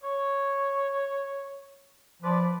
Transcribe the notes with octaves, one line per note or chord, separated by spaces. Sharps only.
C#5
F3 B4 D5